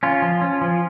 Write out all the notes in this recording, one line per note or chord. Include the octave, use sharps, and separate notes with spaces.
C#4 F4
F3
C#4
F3